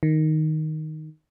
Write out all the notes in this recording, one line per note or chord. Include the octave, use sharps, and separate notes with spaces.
D#3